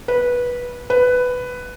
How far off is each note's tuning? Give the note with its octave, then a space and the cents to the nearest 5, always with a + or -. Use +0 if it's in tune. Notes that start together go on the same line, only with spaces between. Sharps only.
B4 -15
B4 +10